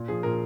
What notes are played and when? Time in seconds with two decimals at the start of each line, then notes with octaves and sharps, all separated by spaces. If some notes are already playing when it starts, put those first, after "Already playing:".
Already playing: A#2
0.08 F3 G#4
0.23 A#2 A#4